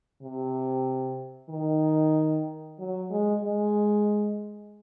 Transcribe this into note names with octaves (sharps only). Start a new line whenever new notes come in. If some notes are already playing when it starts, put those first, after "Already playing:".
C3
D#3
F#3
G#3
G#3